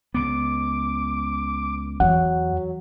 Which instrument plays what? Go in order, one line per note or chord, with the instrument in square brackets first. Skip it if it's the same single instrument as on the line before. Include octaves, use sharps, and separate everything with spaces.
[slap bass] C#2 B3 [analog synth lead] D6
[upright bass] E2 [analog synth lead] F#3 [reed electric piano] F#5